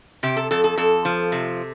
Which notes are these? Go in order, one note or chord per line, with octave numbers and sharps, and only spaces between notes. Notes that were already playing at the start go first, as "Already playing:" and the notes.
C3 G4
A4
F2 A4
A4
F2 A4
F3
C3